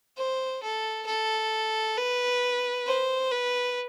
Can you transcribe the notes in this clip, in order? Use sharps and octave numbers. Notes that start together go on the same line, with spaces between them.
C5
A4
A4
B4
C5
B4